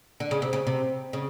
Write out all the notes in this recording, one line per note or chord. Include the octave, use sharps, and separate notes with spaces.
D3
C#3
C3
C#3
C3
C#3